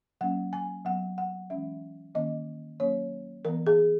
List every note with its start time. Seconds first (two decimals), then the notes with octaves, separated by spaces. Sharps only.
0.21 F#3 A#3 C#4 F#5
0.53 G#5
0.85 F#3 B3 F#5
1.18 F#5
1.50 E3 G#3 C#4 E5
2.15 D#3 A#3 C#4 D#5
2.80 F#3 A#3 C#4 C#5
3.45 E3 B3 A#4
3.67 G#4